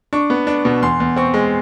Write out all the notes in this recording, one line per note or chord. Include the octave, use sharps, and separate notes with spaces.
D4 C#6
B3
D4
B2
E2 C6
E2
C4 C#6
G#3